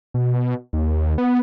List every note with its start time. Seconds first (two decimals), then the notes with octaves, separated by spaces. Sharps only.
0.14 B2
0.73 D#2
1.18 B3